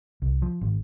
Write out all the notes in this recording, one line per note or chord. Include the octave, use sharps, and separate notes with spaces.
C2
F3
G#1